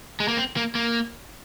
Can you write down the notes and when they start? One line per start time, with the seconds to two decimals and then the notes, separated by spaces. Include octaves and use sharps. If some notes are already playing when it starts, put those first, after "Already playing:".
0.20 G#3
0.28 A#3
0.37 C4
0.57 A#3
0.75 A#3